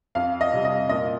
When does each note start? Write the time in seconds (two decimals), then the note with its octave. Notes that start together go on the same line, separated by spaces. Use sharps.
0.15 F2 F5
0.41 D#5
0.53 C3 G3
0.65 D#5
0.89 A#2 D#5